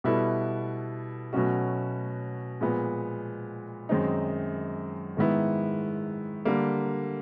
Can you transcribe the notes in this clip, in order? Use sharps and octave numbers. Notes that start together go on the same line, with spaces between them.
B2 G3 B3 E4 A4
B2 F#3 A3 C#4 F#4
A#2 F3 G#3 B3
F#2 D#3 G#3 C4 D#4
G#2 D#3 G#3 B3 E4
D3 G3 A#3